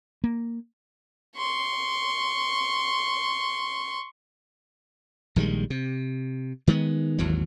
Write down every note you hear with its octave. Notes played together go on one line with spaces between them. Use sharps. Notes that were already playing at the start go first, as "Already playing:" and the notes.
A#3
C6 C#6
A#1 D#3 G3 G#3
C3
D#3 G#3 A#3 B3
G#1 D#2 E3 F#3